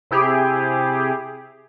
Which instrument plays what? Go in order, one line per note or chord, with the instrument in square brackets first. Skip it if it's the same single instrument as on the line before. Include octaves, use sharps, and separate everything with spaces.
[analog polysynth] C3 E4 G4 G#4